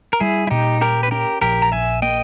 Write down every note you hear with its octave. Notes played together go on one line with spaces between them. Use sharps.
A#4
G3 E4 G#4
E4
A#2 D#4 G4
C#4 G4 A#4
B4
C#4 G4 A#4
A#1 G4 A#4
A#5
A#1 E5 G#5
A#3 D#5 G5